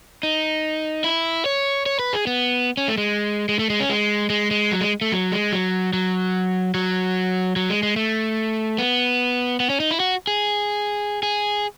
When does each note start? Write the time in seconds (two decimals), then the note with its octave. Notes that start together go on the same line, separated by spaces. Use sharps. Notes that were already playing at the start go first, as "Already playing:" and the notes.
0.23 D#4
1.04 E4
1.46 C#5
1.86 C#5
1.99 B4
2.13 G#4
2.27 B3
2.77 C#4
2.88 A3
2.98 G#3
3.49 G#3
3.59 A3
3.70 G#3
3.80 C#4
3.89 G#3
4.30 G#3
4.51 G#3
4.71 F#3
4.81 G#3
5.01 A3
5.12 F#3
5.32 G#3
5.52 F#3
5.93 F#3
6.74 F#3
7.56 F#3
7.70 G#3
7.83 G#3
7.96 A3
8.78 B3
9.60 B3
9.70 C#4
9.80 D#4
9.91 E4
10.00 F#4
10.27 G#4
11.23 G#4